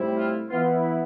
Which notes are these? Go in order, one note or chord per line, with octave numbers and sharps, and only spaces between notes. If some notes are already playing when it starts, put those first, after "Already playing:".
Already playing: A2 G3 C4 E4
F4
E3 B3 E4 F4